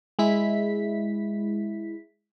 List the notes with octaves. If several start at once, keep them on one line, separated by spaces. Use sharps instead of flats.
G#3 E4 B6